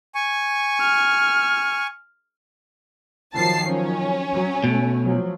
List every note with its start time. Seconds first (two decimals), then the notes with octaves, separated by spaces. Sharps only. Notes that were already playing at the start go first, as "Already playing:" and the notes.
0.15 G#5 C#6
0.81 F6
3.34 D#3 F3 F#3 A5 C7
3.68 C#4
4.32 F#3
4.64 B2 A3
5.03 F3 F#3